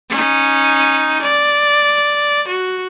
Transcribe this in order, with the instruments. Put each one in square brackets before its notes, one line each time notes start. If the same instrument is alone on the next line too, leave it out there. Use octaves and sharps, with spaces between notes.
[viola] C#4 D#4
D5
F#4